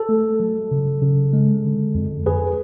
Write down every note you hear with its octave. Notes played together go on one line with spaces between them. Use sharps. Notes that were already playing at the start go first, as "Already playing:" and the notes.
Already playing: A4
A3
F#3
C#3
C#3
G#3
D3
F2
F2 G#4 B4